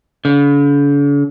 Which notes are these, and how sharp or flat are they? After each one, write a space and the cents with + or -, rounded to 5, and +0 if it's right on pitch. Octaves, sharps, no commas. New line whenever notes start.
D3 -45